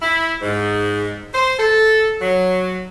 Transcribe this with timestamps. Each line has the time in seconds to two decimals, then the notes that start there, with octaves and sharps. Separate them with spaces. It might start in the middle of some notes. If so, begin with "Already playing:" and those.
0.01 E4
0.42 G#2
1.33 C5
1.58 A4
2.21 F#3